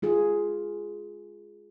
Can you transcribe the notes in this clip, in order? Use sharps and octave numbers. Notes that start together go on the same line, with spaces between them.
G#3 F4 G#4